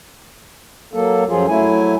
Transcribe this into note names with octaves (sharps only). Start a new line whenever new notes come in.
F#3 A#3 A4
F#2 F3 F#3 F4 G#4
F#3 A3 E4 G#5